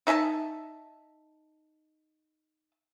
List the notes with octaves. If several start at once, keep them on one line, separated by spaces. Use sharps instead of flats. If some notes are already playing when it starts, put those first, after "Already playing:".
D#4 E5 G#5 A5